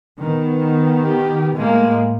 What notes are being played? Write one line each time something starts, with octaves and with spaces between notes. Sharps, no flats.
D#3 B3
G4
A2 G#3 A#3